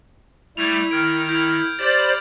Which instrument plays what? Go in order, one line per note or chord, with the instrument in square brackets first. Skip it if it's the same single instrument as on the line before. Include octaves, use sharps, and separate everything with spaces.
[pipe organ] G3 A3 [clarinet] E4 [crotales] G#6 F7
[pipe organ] D#3 [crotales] F6 G#6 D7
[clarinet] E4 [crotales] G6 F7
[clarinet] G4 [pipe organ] C5 D5 B5 [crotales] G6 A6